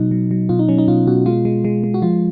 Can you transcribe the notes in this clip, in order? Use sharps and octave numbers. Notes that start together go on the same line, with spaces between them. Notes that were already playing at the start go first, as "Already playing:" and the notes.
Already playing: B2 F#3 D#4
F#3
F#3
B2 F4
D#4
F#3 C#4
D#4
B2 F4
B2 F#4
G#3 F4
G#3
G#3
G#3
F#4
F3 F4